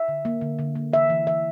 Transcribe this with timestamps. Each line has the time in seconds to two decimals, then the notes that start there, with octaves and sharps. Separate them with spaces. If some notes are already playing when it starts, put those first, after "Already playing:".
Already playing: E5
0.08 D3
0.25 A#3
0.41 D3
0.59 D3
0.75 A#3
0.93 E3 E5
1.10 E3
1.27 E3 E5